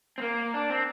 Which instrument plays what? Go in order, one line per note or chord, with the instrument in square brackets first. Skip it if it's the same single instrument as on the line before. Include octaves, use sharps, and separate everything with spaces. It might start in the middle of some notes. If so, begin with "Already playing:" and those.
[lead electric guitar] C4
A#3
D4
C4